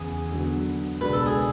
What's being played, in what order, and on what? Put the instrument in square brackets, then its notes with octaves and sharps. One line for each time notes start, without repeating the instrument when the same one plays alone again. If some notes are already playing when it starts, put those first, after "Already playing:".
Already playing: [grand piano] E2 C#3 E3 [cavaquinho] G#4
[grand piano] D3 F#3 B3
[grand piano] C#2 B2 G#3 D4 [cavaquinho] B4
[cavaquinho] A4
G#4